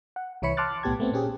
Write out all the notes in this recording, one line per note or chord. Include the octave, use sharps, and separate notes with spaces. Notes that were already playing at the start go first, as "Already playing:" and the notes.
F#5
C2 E3 E4 C#5 B5 C#7
A5 C6 D6 F6 F#6 A6
B1 A2 B3 G4 A5 G#6
A3 B3 C4
A#2 C#4 G4 G#4